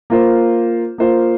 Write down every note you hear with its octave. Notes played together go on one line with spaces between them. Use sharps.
A#3 F4 C5
A#3 F4 C5